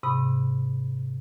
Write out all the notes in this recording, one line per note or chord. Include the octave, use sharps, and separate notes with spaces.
G#2 C3 B5 D#6